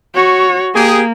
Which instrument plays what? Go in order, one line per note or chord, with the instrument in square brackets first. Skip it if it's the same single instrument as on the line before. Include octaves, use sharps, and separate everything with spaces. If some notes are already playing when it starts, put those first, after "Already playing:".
[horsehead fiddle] F#4 C#5
[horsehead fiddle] A#3 [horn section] G4 G#4